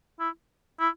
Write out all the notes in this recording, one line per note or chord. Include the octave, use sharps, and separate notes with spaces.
E4
E4